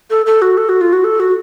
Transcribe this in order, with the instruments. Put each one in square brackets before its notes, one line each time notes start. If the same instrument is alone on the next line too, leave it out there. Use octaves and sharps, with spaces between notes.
[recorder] A4
A4
F#4
A4
F#4
F4
F#4
A4
F#4